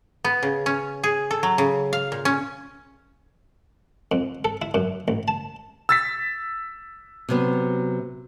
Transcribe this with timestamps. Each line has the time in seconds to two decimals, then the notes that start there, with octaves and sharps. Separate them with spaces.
0.24 B3
0.43 C#3
0.66 C#4
1.04 G#4
1.31 A4
1.43 F#3
1.58 C#3
1.93 F5
2.12 A#2
2.25 C#4
4.12 F2
4.45 A4
4.62 E4
4.74 F#2
5.08 A1
5.28 A5
5.89 E6 A6 B6
7.29 C3 F#3 B3